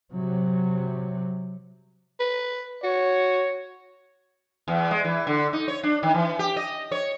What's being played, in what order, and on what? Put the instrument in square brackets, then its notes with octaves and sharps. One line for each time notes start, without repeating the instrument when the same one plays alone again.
[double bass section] C3 F#3
[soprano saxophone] B4
[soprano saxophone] F#4 [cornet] C#5
[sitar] E2
G#3
E3
D3
D#4
C#5
D4
D#3
E3
G4
D#5
C#5